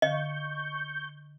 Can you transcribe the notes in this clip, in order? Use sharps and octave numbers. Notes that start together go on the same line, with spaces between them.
D3 D#5 F5 C#6 G6